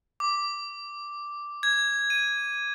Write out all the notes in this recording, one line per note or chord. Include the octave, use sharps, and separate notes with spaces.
D6
G#6
D#7